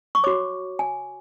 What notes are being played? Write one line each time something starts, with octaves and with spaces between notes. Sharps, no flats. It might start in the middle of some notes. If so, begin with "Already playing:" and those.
C#6
F#4 C#5 D6
G#5